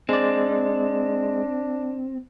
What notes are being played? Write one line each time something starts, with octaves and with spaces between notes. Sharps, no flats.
G#3 C4 D4 D5